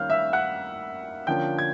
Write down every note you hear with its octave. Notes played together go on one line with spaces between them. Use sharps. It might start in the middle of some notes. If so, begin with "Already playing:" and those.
Already playing: D#3 G3 A#3 C#4 F5 F6 G6
E5 E6
F#5 F#6
D3 F3 A#3 C#4 G5 G6
G#6